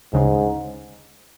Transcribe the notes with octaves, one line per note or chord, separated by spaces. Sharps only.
D2 G#2 C#3 G#3